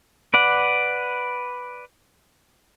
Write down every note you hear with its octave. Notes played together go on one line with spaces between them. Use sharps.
B4 D5 F#5